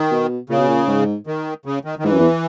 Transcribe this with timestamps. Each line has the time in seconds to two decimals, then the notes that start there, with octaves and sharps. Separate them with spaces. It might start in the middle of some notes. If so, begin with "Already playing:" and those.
Already playing: D#3
0.11 B2
0.50 A#2 C#3
0.58 B2
0.68 A#2
0.88 G#2
1.27 D#3
1.66 C#3
1.85 D#3
1.99 D#3
2.04 G#2 E3
2.12 F#2
2.20 E2